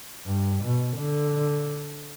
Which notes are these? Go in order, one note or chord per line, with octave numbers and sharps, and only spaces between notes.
G2
B2
D3